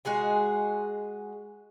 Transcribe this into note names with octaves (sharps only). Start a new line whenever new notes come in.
G#3 F#4 G#4 G#5